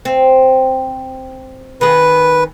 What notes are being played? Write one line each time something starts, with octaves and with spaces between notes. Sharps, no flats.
C4
D#3 G#4 B4